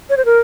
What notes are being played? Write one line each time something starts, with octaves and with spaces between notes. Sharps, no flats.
C#5
C5
A#4